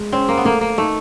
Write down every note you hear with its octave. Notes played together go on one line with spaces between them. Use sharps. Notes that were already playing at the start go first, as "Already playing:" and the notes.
Already playing: G#3
C4 C#4
A#3
B3
A3 A#3
A#3
A3 D#4